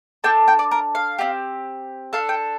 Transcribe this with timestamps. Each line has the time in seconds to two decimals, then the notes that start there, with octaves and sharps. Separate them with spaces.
0.24 D4 A4 G5
0.48 G5
0.59 D5
0.71 A#4
0.95 F5
1.19 C4 D#4 G4
2.13 D4 A4 F5
2.29 G5